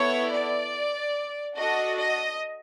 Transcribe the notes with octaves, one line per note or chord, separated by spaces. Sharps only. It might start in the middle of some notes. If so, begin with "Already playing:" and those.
Already playing: B3 E4 A4 C#5
D5
D4 F#4 A4 D#5
D#5